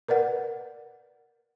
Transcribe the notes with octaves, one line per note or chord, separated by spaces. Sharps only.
A#4 B4 D5 F#5